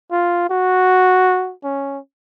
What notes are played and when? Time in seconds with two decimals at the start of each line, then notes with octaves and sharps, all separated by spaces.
0.11 F4
0.50 F#4
1.64 C#4